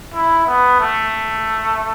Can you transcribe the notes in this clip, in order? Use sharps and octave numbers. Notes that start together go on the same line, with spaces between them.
E4
B3
A3